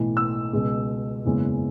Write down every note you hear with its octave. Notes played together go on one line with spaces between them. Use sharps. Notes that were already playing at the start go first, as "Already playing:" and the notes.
Already playing: B1 A2 E3
E6
C#2 B2 G#3
F#1 E2 C#3 G#3